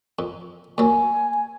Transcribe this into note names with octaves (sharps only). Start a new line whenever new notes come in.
F2
D#2 F#3 G#5